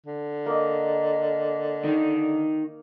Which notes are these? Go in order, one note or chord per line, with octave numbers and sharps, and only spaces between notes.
D3
A#3 D#5
D#3 D#4